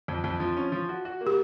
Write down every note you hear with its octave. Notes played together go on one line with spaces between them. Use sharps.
F2
F2
F3
C#4
F3
F#4
F#4
A#3
G4